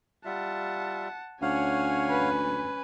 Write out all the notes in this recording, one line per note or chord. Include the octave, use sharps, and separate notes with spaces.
G3 F4 E5 F#5 A5
D2 C#4 C#5 F5 F#5 G#5
B4